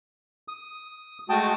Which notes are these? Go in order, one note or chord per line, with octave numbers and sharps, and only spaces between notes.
D#6
G#3 A3 F#4 G5 A5 D#6